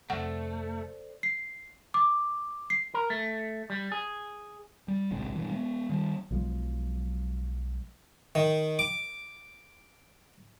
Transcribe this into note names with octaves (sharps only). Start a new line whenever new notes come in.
F2 C3 A3 A4 C5 D5 F#5
C7
D6
C7
A#4
A3
G3
G#4
G3
D1 A#1 C3 G#3
G2 B2 E3
G#3 B3
D#3 G3
B1 F3 F#3 G#3
D#3
D6